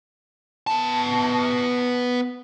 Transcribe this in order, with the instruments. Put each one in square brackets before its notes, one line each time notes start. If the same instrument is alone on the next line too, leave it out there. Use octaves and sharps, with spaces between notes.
[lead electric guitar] B3 A5